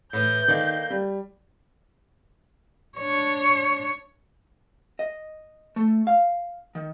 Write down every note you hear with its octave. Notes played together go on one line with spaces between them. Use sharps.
A2 E3 G6
D#3 A#3 A4 D5
G3
D4 C#5
D#5
A3
F5
D#3